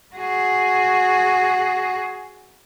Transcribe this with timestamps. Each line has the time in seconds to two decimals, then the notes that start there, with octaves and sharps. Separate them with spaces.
0.16 F#4 G#4